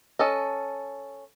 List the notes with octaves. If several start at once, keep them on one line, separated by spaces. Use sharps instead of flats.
C#4 A4 D#5